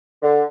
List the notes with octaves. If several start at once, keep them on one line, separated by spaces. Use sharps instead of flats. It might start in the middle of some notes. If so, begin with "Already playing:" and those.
D3